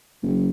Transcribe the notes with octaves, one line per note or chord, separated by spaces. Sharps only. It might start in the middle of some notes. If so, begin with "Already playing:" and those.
F#1